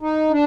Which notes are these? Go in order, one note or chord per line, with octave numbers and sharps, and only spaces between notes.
D#4
D4